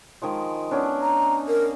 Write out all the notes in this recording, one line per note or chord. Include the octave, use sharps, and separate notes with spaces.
D#3 F3 G#3
B3 C#4 D4
A#5
A#4